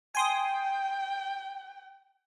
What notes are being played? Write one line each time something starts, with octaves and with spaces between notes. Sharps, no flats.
G5 G#5 C6 D#6